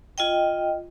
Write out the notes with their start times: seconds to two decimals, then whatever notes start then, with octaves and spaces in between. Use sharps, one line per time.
0.18 F4 D#5 G5